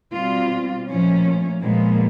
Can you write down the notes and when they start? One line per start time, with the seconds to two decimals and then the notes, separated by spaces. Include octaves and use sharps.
0.13 B2 G3 C4 F4
0.87 A#2 F3 A3 C#4
1.61 A#2 F3 G#3 B3